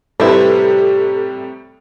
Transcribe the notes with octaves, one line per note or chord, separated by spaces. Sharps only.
A2 C3 G3 C4 E4 G4 A4 B4